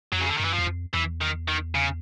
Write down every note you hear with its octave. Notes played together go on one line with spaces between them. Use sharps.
F2 F#3
C#3
D3
F#2 D#3
E3
E2 F3
F2
E2 E3
D#3
D#3
C#3